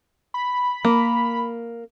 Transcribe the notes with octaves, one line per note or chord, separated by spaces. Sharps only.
B5
A#3